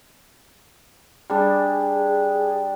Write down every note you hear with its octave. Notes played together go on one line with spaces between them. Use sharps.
G3 D4 G#4